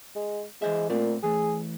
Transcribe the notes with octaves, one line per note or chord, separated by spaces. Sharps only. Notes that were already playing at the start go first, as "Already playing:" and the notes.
G#3
E3 G#3 C5 E5
A#2 A3 A#3 C4
E3 A3 G#4